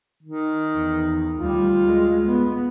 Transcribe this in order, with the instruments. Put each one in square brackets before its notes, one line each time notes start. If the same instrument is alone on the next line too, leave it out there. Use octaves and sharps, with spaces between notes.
[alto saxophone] D#3
[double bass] E2
[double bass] D2 G3 [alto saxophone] F4
[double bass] G#3
B3